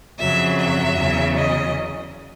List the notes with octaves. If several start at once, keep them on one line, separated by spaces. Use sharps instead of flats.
F2 C#3 F#3 E5
E5
E2 C#3 F#3
D#5